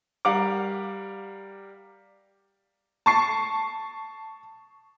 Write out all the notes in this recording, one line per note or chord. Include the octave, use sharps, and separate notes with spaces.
G3 A#4 F5 F#5 D6
A5 C#6 C7